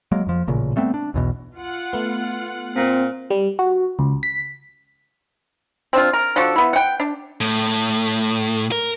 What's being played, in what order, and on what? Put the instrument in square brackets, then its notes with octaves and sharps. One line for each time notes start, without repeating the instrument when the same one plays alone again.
[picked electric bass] F#3 G#3 A#3
F2 F3
A1 A#2 C#3 A#3
G3 A3 B3 C4
D4
B1 E2 B2
[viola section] F4 F#5
[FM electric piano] A3 B3
[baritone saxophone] A#2 [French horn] C4
[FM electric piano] G3
F#4
C#2
B6
[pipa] C4 D4 F4
A#4
F3 D4 F#4 A4
B3 E4
F#5 G5
D4
[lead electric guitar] A2
A#4